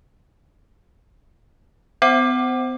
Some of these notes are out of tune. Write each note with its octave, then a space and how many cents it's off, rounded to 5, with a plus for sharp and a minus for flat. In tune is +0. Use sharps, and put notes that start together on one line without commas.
B3 +45 C5 +0 F#5 +25